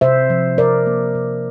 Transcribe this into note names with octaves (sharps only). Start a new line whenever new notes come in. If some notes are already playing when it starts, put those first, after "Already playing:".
C3 C5 E5
F3
C3 A#4 D5
A#3
C3